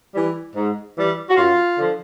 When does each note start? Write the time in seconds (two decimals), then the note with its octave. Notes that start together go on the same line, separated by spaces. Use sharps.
0.14 E3 G3
0.54 G#2
0.95 E3 G3
1.28 F#4
1.36 F#2 F4
1.76 D3 F3